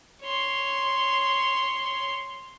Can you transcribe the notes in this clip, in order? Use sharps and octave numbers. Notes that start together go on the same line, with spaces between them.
C#5 C6